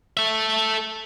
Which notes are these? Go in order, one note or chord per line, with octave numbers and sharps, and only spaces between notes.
A4 E5